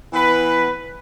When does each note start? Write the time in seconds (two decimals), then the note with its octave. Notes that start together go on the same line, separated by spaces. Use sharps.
0.14 E3 B3 B4